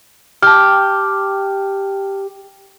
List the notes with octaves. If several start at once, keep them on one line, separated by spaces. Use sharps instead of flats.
G4 A5 F6